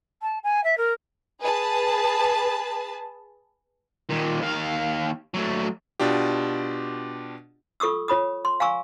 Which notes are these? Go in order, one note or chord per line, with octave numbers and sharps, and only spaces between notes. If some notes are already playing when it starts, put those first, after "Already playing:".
A5
G#5
E5
A#4
G#4 B4 A5
D#2 A#2
D#2 F5
F#3 A3
B2 D4 F4 G4
F4 A4 C#6 D#6 E6
F4 C#5 B5 D#6
C6
F5 G#5 A#5 C#6 E6